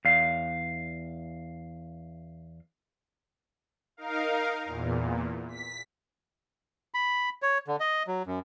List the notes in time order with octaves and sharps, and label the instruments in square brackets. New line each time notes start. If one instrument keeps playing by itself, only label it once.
[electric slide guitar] E2 F5
[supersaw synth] D#4 A#4 F5
E2 A#2
B6
[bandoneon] B5
C#5
D3
D#5
F#3
F#2